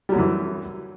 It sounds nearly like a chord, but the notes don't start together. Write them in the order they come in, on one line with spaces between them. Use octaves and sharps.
G3 F#3 F#2 E3